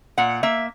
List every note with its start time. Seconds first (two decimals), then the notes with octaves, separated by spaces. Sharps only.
0.18 A#2 F#5
0.43 A#3 E5